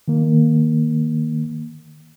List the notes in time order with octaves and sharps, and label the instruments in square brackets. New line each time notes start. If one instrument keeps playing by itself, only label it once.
[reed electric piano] D#3 A#3